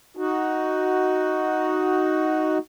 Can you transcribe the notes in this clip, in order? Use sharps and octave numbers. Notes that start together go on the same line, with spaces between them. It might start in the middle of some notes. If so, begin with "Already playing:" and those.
D#4 F#4